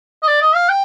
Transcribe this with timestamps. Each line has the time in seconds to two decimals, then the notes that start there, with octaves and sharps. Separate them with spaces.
0.23 D#5
0.28 D5
0.42 D#5
0.55 F5
0.69 G5